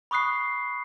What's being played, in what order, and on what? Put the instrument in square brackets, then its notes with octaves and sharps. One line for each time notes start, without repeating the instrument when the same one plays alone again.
[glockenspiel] B5 C#6 D#6 F#6 C7